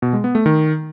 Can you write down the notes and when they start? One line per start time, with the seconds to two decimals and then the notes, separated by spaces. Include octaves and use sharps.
0.02 B2
0.13 G#3
0.24 B3
0.35 A3
0.46 D#3